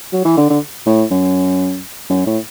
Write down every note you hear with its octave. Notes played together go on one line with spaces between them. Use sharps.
F#3
E3
D3
D3
A2
F#2
F#2
A2